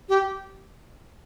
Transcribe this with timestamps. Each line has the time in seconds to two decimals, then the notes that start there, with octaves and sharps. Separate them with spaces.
0.09 G4